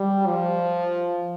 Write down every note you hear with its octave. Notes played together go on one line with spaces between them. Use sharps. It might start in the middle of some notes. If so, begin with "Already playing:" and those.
Already playing: G3
F3